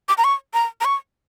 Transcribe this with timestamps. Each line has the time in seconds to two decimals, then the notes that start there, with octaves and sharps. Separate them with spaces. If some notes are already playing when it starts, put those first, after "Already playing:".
0.08 D6
0.18 A#5
0.24 C#6
0.54 A#5
0.81 A#5
0.85 C#6